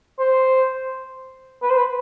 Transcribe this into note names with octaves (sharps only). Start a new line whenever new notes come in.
C5
B4
C5
B4